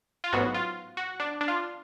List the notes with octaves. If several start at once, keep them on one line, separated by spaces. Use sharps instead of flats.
F4
A1 G#2 F#3 B3 F#4
F4
F#4
D4
D4
F4